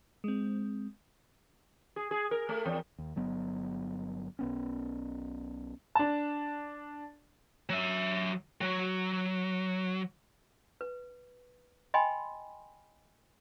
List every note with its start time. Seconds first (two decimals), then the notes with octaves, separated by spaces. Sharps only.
0.24 G#3 C4
1.96 G#4
2.11 G#4
2.31 A#4
2.49 A3
2.66 E2
2.98 D#2
3.16 G1 F#3 B3
4.39 B1 B3 C#4
5.95 D4 A5
7.70 F#3 E5
8.61 F#3
10.81 B4
11.94 D#5 G5 G#5 B5 C6